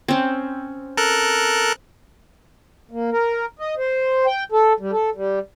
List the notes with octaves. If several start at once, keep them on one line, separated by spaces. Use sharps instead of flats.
C4 C#4
A4 A#4 F#6
A#3
A#4
D#5
C5
G5
A4
G3
A4
G3